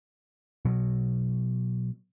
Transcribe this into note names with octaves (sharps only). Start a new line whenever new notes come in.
B2 F#3